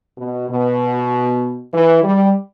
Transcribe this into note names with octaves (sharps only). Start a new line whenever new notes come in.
B2
B2
E3
G3